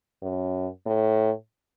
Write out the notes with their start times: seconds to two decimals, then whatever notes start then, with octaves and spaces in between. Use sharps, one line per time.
0.22 F#2
0.86 A2